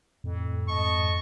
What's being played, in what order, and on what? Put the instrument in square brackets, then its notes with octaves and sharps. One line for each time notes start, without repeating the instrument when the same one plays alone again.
[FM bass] F2 [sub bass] A2
[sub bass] G#2 [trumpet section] D#5 A5 C#6